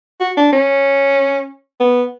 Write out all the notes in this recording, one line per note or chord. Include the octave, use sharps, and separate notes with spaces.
F#4
D4
C#4
B3